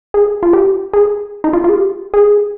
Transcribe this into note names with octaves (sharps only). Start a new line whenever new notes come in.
G#4
F4
G4
G#4
D#4
F4
F4
G#4
G4
G#4